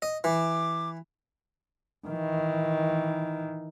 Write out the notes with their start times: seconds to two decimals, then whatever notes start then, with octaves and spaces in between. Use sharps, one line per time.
0.02 D#5
0.24 E3 D6
2.07 D#3 E3